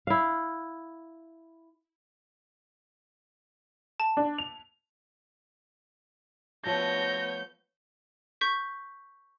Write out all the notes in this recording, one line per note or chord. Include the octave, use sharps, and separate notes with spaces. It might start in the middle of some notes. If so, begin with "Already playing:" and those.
E4 F5
A5
D4
F7
F3 A3 B3 C#5 G6 A#6
C#6 G6 B6